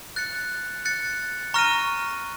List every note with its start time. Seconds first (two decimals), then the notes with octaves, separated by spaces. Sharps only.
0.16 F#6 A6 C#7
0.85 F#6 A6 C#7
1.54 A#5 C#6 F6 A#6 D#7